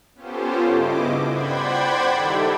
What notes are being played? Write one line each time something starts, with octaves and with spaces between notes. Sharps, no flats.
B3 C#4 F4 G4 A4 C5
G2 C#3 E4 D#5 D6
C5 D5 F#5 G5 B5 G#6
D#3 G3 D#4 E4 G4 A4